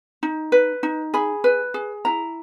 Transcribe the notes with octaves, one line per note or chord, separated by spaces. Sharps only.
D#4
B4
D#4
G#4 B5
B4
G#4
E4 A#5